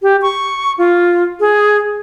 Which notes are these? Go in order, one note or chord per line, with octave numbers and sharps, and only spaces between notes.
G4
C#6
F4
G#4